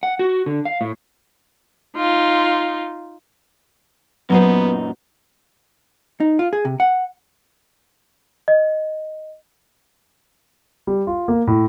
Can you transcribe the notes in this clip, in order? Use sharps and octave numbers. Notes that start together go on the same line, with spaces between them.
F#5
F#4
D3
F5
A2
D#4 F4
F#2 A#2 F#3 B3 D#4 B4 C5
D#4
F4
G#4
C3
F#5
D#5
G3
F4
A#3
A2